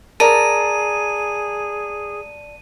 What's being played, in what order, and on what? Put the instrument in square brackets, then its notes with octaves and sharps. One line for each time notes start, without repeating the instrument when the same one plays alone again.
[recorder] G#4 [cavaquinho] A#4 [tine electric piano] D5 A5 [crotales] D#7